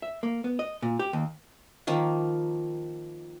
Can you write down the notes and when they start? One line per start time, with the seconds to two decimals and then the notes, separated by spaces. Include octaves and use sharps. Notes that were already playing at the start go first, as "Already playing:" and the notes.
0.02 E5
0.23 A#3
0.44 B3
0.59 D#5
0.82 A#2
0.99 G4
1.13 D#2
1.87 D#3 F3 A#3